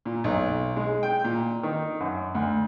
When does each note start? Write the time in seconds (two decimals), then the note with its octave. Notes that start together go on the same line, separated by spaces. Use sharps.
0.05 A#2
0.24 B1
0.76 G#3
1.03 G5
1.24 A#2
1.63 D#3
2.00 F#2
2.35 D2